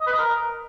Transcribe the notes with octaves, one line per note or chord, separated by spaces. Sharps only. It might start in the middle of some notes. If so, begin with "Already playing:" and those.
D#5
B4
D#5
A#4